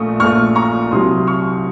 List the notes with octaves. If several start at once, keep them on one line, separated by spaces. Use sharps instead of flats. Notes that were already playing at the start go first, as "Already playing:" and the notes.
Already playing: A#1 A#2 A3 C#6 D#6
A#1 A#2 A3 C#6 F6
A#5 C#6
C2 C3 F#3 C6 D#6
C#6 F6